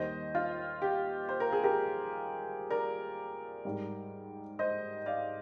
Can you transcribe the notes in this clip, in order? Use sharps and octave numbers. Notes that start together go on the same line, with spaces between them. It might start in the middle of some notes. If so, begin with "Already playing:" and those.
Already playing: D#2 D#3 G3 C5 D#5
F4
G4
C5
A#4
G#4
G4 A#4
A#4 D5
G#2 G3
C5 D#5
D5 F5